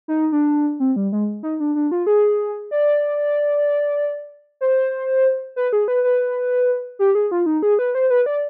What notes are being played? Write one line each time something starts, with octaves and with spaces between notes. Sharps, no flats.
D#4
D4
C4
G3
G#3
D#4
D4
D4
F4
G#4
D5
C5
B4
G#4
B4
B4
G4
G#4
F4
D#4
G#4
B4
C5
B4
D5